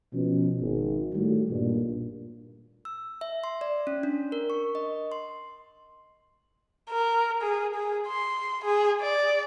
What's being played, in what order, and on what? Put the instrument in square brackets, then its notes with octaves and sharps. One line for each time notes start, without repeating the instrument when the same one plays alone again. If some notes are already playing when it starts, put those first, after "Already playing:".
[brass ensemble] B2 F3 C#4
G#1
A2 D#3 G3 A3 F#4
B1 G2 A#2
[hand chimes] E6
E5
C6
D5
C#4
D4
A#4
C#6
D#5
C6
[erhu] A#4
G#4
G#4
C6
G#4
D5